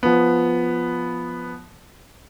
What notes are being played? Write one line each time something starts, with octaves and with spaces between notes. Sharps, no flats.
F3 B3